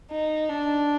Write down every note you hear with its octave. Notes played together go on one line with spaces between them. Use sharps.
D#4
D4